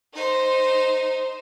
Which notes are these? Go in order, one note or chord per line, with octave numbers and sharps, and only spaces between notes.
D#4 C5